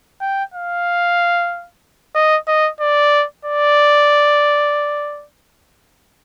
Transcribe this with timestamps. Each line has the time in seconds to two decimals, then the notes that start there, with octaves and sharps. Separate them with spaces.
0.21 G5
0.54 F5
2.15 D#5
2.47 D#5
2.80 D5
3.45 D5